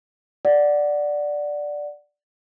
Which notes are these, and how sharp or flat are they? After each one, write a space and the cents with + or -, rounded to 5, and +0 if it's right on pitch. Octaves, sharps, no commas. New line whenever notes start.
D5 +0 F#5 +0